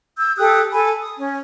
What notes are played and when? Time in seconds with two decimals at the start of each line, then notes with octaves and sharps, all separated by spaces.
0.17 E6 G6
0.37 G4 A4 D#6 F#6
0.72 A4 G#5 B5
1.00 D#6
1.18 C#4